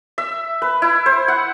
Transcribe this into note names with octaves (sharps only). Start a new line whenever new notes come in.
E5
B4
E4
C5
F#5